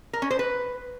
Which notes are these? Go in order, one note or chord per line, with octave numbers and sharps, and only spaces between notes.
A#4
C#4
C5
B4